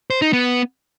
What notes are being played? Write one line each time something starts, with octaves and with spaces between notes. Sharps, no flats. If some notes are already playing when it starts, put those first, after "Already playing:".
C5
D#4
B3